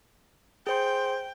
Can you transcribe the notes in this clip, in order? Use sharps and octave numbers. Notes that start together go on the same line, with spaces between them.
G#4 C5 G5 C6